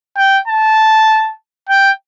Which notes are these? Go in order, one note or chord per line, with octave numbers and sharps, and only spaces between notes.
G5
A5
G5